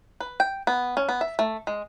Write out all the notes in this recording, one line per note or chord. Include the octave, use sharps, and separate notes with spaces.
B4
G5
B3
C#4
B3
E5
A3
G#3